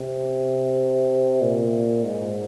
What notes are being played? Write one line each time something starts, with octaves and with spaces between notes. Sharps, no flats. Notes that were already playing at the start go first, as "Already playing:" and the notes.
Already playing: C3
A#2
G#2